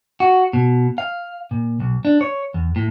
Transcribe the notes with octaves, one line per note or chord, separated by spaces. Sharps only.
F#4
B2
F5
A#2
B1
D4
C#5
E2
A2